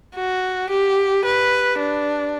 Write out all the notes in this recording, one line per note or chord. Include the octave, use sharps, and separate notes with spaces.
F#4
G4
B4
D4